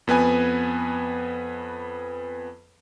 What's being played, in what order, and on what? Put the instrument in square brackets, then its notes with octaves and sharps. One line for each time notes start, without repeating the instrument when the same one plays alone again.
[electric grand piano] F2 B3 B4 G#5